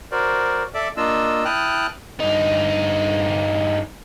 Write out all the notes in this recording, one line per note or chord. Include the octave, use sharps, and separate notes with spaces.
F#4 A#4 C5 D5
A4 D5 E5 D6
A#3 D4 F4 D#5 E6
E4 G5 A5 D#6 F6 F#6
G2 D#4